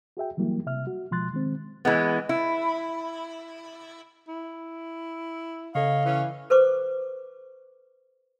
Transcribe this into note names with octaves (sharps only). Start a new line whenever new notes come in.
F#4 G#4 E5 G5
E3 F#3 G3 A#3 E4
C3 E5 F6
F#4
B2 F3 G#3 C6 F#6 A6
D#3 G#3 C4
E3 G#3 B3
E4
E4
C#3 A4 C#5 D#5 F5
E3 C#4
A4 B4 C5 C#6 D6